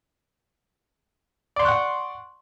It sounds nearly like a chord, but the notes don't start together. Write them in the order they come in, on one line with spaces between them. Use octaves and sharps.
D5 C6 C#6 F#6 F#5